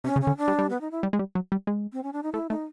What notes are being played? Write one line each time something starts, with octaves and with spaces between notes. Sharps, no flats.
C3 C#4
C#3
C#4
D3
D4
G3
G3
B3
D#4
E4
G3
G#3
G3
F#3
G3
G#3
C4
C#4
D4
D#4
A3 E4
A3 D#4